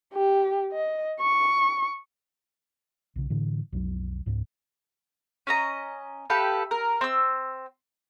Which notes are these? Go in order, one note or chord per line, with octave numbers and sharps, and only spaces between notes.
G4
D#5
C#6
B1 C#3
A2 D3 E3
B1 F2 E3 F#3
C#2 G#2
C#4 D#5 A#5
G4 A4 B4 F5
A#4
C4 E6